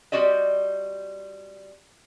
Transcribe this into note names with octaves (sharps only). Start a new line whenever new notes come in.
G3 C4 F#4 D5 D#5